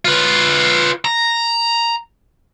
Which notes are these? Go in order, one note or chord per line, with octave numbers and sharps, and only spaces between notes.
F4 B4
A#5